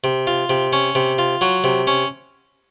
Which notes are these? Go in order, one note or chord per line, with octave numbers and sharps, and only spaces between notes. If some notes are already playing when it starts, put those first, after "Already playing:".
C3
F4
C3
C#4
C3
F4
F#3
C3
C#4